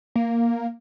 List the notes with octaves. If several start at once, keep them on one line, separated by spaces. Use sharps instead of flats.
A#3